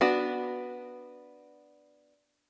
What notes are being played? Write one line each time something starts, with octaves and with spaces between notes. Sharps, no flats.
B3 D4 F#4